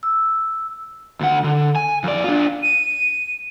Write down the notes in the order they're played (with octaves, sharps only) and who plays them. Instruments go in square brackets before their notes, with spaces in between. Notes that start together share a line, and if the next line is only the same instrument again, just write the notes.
[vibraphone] E6
[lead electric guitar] D2 F#5
D3
G#5
F2 D5
D4 F4
[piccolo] D#7